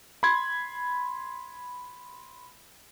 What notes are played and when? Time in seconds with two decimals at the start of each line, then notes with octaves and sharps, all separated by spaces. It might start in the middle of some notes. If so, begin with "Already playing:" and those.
0.23 B5 C6 G#6